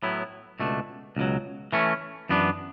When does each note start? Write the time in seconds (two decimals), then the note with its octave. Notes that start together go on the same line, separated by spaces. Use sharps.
0.03 A2 F#3 B3 E4
0.60 C#2 B2 A3 D4
1.17 C#2 B2 F#3
1.73 E3 A3 C#4
2.29 F#2 E3 B3 D4